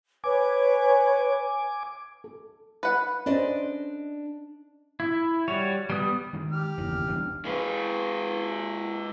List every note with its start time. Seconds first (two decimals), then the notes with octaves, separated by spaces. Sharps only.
0.24 B4 C#5 G#5 D6
2.24 A4
2.83 B4 F#5
3.26 C#4 D4 A4 C5 D5 D#5
5.00 E4
5.48 G3 F#4 C#5
5.90 G3 B3 D#6
6.33 D#3 G#3
6.52 G4 F6
6.78 F#1 E2 D#3
7.07 E1 C2 D4
7.45 G#3 B4